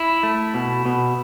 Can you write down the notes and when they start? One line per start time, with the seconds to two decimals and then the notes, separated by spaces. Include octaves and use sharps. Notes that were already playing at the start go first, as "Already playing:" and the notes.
Already playing: E4
0.23 A3
0.54 B2
0.86 B2